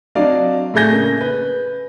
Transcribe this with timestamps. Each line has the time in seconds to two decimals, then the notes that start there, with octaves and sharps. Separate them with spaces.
0.15 F#3 C4 D4 D5 D#5 F5
0.74 A2 A3 G#4 G6 A#6
0.92 C#3 A#3
1.21 B4